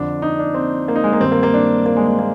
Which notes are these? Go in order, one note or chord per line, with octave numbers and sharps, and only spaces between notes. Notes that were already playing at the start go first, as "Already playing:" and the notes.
Already playing: F2 D3 D4
D#4
D4
C4
A#3
D#4
G#3
A#3
G2 D#3 C4
A#3
A#3
D4
A#3
G#3
G#3
A#3